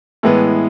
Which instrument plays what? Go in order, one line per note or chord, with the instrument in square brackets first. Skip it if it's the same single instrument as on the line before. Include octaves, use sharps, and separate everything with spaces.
[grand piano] A2 E3 G#3 B3